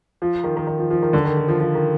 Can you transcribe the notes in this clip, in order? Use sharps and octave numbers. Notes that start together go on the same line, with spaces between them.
F3
D#3
D#3
D#3
F3
F3
D#3
D3
D#3
D#3
F3
F3
D#3